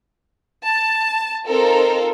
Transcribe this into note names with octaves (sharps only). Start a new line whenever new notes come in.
A5
C4 D#4 F4 A4 A#4